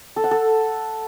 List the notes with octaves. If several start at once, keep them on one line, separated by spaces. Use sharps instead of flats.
A4
F#5
A4